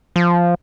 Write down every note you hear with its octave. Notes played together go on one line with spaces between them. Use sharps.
F3